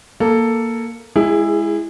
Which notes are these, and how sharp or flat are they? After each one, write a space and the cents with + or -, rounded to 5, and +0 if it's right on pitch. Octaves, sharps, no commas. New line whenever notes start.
A#3 +0 A4 +5
G#3 +0 E4 +10 G#4 -25